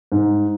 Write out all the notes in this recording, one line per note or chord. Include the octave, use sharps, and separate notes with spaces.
G#2